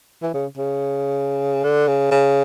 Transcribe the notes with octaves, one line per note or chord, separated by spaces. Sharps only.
E3
C#3
C#3
D3
C#3
C#3